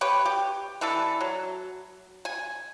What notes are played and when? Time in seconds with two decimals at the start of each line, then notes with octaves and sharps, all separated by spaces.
0.01 G4 B4 C#5
0.25 G4
0.81 E3 D4 E4 A4
1.21 F#3
2.25 G#5